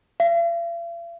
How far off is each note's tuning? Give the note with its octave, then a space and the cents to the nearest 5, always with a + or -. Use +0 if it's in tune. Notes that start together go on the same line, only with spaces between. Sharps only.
F5 -45